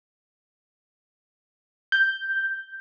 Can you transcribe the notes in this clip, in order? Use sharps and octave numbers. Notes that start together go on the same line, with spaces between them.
G6